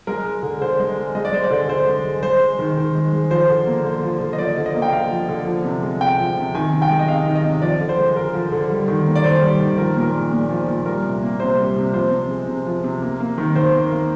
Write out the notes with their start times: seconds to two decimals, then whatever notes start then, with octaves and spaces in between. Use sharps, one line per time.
0.07 G#3 A#4
0.25 G#3
0.43 D3
0.61 D3 C5
0.80 G#3
0.97 G#3
1.15 G#3 D#5
1.25 D5
1.33 G#3 C5
1.44 D5
1.51 D3
1.69 D3 C5
1.87 G#3
2.04 G#3
2.23 G#3 C5
2.41 G#3
2.59 D#3
2.77 D#3
2.95 G#3
3.13 G#3
3.30 F3 C5
3.49 D3
3.67 A#3
3.85 D3
4.03 F3
4.21 D3
4.33 D#5
4.38 F3 D5
4.57 D3
4.66 D#5
4.75 A#3
4.82 G5
4.92 D3 F5
5.11 F3
5.29 D3
5.47 F3
5.65 C3
5.83 G#3
6.01 C3 G5
6.19 F3
6.37 C3
6.55 D#3 G#5
6.72 C3
6.82 G5
6.90 G#3
6.99 D#5
7.08 C3 F5
7.26 D#3
7.35 D#5
7.44 C3
7.62 F3 D5
7.80 D3
7.89 C5
7.98 G#3
8.16 D3 A#4
8.34 F3
8.52 D3
8.70 G3
8.88 D#3
9.07 A#3
9.15 D5
9.24 D#3 C5
9.42 G3
9.60 D#3
9.78 F3 A#4
9.97 A#2 A#4
10.15 G#3
10.32 A#2
10.50 F3
10.68 A#2
10.86 G3 A#4
11.04 C3
11.22 A#3
11.39 C3 C5
11.58 G3
11.76 C3
11.94 F3 C5
12.11 C3
12.30 G#3
12.48 C3
12.66 F3
12.84 C3
13.02 A#3
13.20 A#3
13.38 D#3
13.56 D#3 C5
13.74 A#3
13.92 A#3